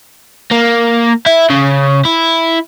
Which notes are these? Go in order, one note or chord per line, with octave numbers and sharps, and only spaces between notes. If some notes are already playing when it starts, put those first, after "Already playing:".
A#3
E4
C#3
E4